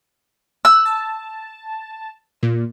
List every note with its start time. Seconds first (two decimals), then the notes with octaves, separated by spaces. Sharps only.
0.65 E6 F#6
0.85 A5
2.43 A#2